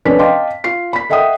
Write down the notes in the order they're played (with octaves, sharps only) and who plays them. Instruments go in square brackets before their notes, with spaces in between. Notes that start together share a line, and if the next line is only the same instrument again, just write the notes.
[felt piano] F1 C#4 D4 B4 D5 B6
D#5 F5 G5 A5 C6 D6
F4 F5 C7
B5 B6
A4 D#5 E5 F#5 G5 D#6